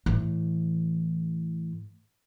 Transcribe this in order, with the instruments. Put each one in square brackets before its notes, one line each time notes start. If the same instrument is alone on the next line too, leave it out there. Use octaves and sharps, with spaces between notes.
[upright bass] A2 E3